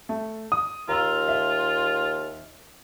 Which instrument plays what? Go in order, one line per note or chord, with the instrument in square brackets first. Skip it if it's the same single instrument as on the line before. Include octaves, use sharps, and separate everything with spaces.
[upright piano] A3
D#6
[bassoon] D#2 [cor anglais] F4 [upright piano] A#5 E6
[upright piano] E5